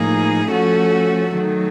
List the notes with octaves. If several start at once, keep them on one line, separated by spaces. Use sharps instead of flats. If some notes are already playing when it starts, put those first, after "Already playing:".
Already playing: A2 F3 A#3 D#4 G#4
F3 A3 C#4 F#4 A4
D#3 F#3 A3